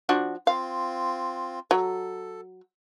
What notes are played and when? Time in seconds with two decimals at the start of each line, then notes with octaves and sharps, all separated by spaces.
0.09 F3 D4 F#4
0.47 C4 F4 F5
1.71 F#3 A4